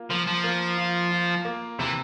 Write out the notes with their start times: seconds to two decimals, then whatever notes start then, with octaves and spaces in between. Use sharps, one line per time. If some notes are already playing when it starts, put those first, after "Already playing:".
Already playing: A#3 F4
0.10 F3 A#3
0.27 F3
0.44 A#3
0.77 F4
1.11 F4
1.45 A#3
1.79 C3 E3